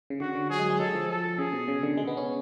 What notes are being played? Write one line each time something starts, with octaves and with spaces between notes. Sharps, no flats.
C#3
D3 F#4
D3
F#3 G#4
G#3
G#3
F#3 A4
F3
A4
C#3 G#4
B2
C#3
D3
G#3
B3
C#4